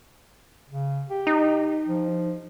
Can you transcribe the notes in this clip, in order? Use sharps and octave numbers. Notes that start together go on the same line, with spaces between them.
C#3
G4
D#4
F3